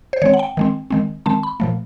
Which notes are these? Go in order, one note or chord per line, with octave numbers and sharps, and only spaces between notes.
C5
D#3 G#3 C4 C#5
F#5
G5
D#3 G#3 C4
D#3 G#3 C4
D#3 G#3 C4 A5
B5
A#2 F3 A3